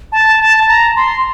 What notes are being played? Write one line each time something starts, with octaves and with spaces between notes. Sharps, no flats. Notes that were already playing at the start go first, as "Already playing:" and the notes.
A5
A5
A#5
C6